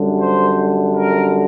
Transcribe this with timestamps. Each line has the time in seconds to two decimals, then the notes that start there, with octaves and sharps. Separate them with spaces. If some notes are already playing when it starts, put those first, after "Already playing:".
Already playing: F#2 D3 G3
0.21 C5
0.98 A#4